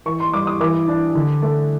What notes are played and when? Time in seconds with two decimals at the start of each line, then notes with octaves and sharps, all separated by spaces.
0.06 E3 C#6
0.20 C6
0.33 G2 D6
0.47 D#6
0.60 E3 D6
0.88 D4
1.15 D3
1.42 A3